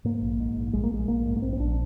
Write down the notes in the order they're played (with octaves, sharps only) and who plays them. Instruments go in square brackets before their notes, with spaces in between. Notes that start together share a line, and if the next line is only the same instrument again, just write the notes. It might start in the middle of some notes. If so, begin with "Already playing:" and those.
[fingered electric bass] G#2 A#3
A#1
G#2
A#1
A#1 G#3
A#3
A#1 G#3
A#1 A#3
G#2
A#3
A#1 C4
C4
A#1 D4